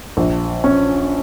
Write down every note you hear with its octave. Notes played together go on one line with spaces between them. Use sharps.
A#1
C#4